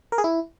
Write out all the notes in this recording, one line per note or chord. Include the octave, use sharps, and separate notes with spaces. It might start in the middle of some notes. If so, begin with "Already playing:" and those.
A#4
G#4
E4